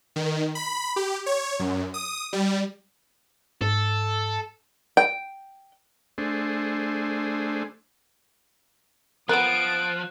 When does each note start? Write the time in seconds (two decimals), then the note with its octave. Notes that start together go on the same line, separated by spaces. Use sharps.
0.16 D#3
0.55 B5
0.96 G4
1.26 C#5
1.59 F#2
1.94 D#6
2.33 G3
3.61 G#2 A4
4.97 G5
6.18 A3 D4 G#4 C5
9.29 F3 B3 A#4 D#6 F#6 D7 E7